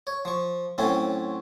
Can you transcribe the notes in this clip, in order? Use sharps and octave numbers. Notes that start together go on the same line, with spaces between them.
C#5
F3 C#6
A2 F#3 C4 C#4 F4